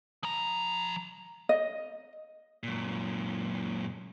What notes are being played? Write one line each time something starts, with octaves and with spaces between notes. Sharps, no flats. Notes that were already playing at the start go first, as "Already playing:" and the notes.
F3 A#5
D#5
F#2 A#2